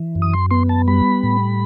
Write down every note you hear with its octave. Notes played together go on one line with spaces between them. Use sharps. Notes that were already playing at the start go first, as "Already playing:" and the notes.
Already playing: E3
F#2
D#6
C6
B3 C6
A5
G3 B5
A2